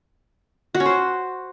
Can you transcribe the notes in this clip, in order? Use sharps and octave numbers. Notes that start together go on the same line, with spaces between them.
F#4
C#4
C5